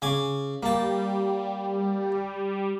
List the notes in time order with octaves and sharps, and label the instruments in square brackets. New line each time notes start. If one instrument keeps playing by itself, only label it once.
[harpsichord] C#3 G#5 D6
[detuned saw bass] G3 [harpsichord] A#3 A5